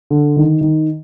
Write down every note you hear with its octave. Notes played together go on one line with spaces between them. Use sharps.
D3
D#3
D#3